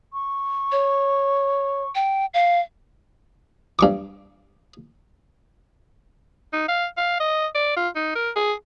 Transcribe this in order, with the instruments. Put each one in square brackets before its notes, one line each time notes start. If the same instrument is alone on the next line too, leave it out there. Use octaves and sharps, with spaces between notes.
[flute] C#6
[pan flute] C#5
G5
F5
[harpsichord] G2 C#6 D6
[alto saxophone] D#4
F5
F5
D#5
D5
F4
D#4
A#4
G#4